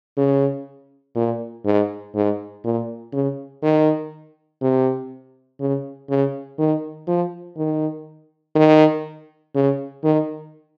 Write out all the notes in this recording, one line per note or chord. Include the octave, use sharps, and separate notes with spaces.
C#3
A#2
G#2
G#2
A#2
C#3
D#3
C3
C#3
C#3
D#3
F3
D#3
D#3
C#3
D#3